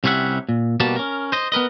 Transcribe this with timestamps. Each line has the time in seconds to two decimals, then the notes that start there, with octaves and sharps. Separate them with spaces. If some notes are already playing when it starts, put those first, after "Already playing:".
0.04 C2 C3 G3 C#4 E5 F#5
0.49 A#2
0.80 B2 G3 A#3 F#4 A5
0.96 C#4 A#4
1.32 C5 D#5
1.52 B3 A#4 B4 D#5